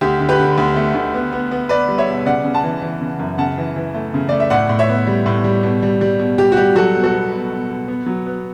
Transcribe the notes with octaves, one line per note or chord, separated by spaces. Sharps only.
D2 G4
D3
G4 B4
D3
D2
A3
D2
B3
B3
B3
B3 B4 D5
G3
C#5 E5
B2
C#3 D5 F#5
C#3
F#5 A5
E3
E3
C#3
F#2
C#3 F#5 A5
E3
E3
A3
C#3
A3 D5
E5
A2 D5 F#5
A2
C#5 E5
B3
G3
A2
G3
B2
G3
G3
B2
G3 G4
F#4
G3 G4
F#3 F#4 A4
B2
F#4 A4
B3
B2
B2
B2
B3
F#3
B3